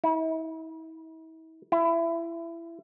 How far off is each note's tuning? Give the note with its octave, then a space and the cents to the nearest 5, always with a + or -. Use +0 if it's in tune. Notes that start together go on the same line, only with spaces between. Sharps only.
E4 -40
E4 +25